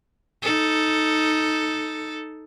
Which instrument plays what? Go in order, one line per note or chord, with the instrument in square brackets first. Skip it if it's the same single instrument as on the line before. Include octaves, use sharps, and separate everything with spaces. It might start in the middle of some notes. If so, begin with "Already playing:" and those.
[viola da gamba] D#4 A4